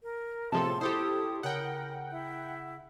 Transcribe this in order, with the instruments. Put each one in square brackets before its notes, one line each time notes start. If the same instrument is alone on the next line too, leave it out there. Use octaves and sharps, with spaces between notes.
[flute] A#4
[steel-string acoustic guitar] A2 G#4 A5 [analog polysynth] C3 F3 A4 [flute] C6
[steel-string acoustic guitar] E4 [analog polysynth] G4 A4 C5 [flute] D#6
[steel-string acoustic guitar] C#3 [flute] A#4 [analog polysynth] F#5 G5
[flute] E4